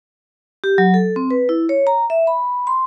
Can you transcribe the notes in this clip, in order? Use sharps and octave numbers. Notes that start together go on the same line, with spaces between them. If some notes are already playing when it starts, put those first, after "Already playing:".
G4
F#3
A4
C4
B4
E4
C#5
A#5
E5
B5
C6